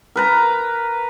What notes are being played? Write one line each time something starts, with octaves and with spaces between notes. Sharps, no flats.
A#4 B4 A#5